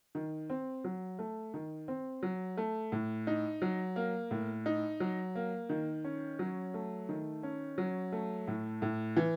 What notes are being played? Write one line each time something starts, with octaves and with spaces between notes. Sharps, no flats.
D#3
C4
F#3
A3
D#3
C4
F#3
A3
A2
D#4
F#3
A#3
A2
D#4
F#3
A#3
D#3
C#4
F#3
A3
D#3
C#4
F#3
A3
A2
A2
E3